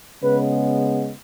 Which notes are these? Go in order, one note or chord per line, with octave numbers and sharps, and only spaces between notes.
C#3 G#3 B3 B4